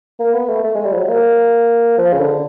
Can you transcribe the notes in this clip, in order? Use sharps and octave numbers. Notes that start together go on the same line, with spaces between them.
A#3
B3
A3
A3
G#3
G3
F3
F#3
A#3
F3
C#3
D3